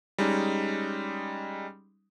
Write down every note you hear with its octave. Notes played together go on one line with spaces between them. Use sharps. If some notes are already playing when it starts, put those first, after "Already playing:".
G3 G#3 C#4 D#4